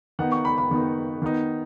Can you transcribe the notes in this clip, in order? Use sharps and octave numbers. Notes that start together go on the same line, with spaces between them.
D#3 B3 D#4 F#5
C#6
B5
B5
D#3 B3 D#4
D#3 B3 D#4